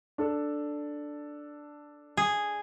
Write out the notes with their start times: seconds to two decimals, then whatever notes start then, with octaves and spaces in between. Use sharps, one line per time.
0.18 D4 A4
2.17 G#4